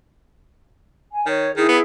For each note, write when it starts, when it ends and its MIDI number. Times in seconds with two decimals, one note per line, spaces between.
1.11 1.25 80
1.26 1.49 51
1.26 1.54 73
1.57 1.67 51
1.57 1.81 64
1.57 1.81 68
1.68 1.79 59